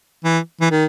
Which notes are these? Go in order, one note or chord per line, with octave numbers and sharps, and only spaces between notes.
E3
E3
D#3